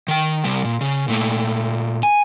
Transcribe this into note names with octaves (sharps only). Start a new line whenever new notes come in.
D#3 G5
C3 G3
A#2
C#3
A#2 A3
G#5